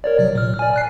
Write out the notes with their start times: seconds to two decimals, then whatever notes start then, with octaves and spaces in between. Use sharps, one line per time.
0.04 A#4 C#5 D5
0.19 C3 F#3
0.35 A#2 F6
0.59 D5 G#5
0.74 G#5 F#6 C7